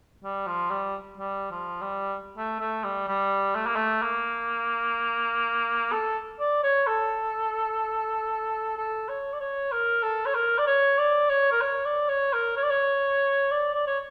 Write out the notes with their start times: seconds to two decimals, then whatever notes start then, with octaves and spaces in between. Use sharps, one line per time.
0.24 G3
0.47 F3
0.70 G3
1.18 G3
1.51 F3
1.82 G3
2.37 A3
2.60 A3
2.84 G3
3.08 G3
3.55 A3
3.66 A#3
3.76 A3
4.02 A#3
5.92 A4
6.40 D5
6.64 C#5
6.87 A4
8.77 A4
9.09 C#5
9.33 D5
9.40 C#5
9.72 A#4
10.03 A4
10.26 C#5
10.35 A#4
10.58 D5
10.67 C#5
10.98 D5
11.29 C#5
11.52 A#4
11.61 C#5
11.85 D5
12.09 C#5
12.33 A#4
12.57 C#5
12.63 D5
12.70 C#5
13.51 D5
13.74 D5
13.87 C#5